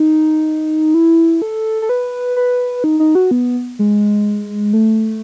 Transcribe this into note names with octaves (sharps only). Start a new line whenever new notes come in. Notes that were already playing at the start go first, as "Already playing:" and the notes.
Already playing: D#4
E4
A4
A4
B4
B4
D#4
D#4
F#4
B3
G#3
A3